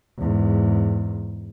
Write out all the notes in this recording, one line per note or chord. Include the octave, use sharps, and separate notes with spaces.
E2 G#2